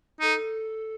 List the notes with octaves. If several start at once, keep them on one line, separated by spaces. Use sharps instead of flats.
D#4 A4